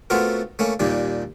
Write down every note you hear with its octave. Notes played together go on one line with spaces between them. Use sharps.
A3 B3 C4 F4 F#4 A#4
A3 A#3 C#4
D#2 A#2 D#3 G3